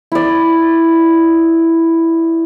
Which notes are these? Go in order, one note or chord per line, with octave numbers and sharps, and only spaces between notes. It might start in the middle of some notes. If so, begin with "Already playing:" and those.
E4 D5